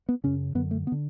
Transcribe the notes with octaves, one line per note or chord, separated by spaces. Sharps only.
B3
F#2 C#3 C#4
F#2 D3 B3
A3
B3
D3